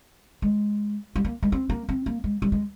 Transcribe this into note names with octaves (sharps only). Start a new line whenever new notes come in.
G#3
G3
A#3
G#3
C4
A#3
C4
A#3
G#3
G3
G#3